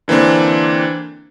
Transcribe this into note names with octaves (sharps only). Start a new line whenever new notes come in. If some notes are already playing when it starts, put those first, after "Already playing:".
D3 E3 A#3 C4 D4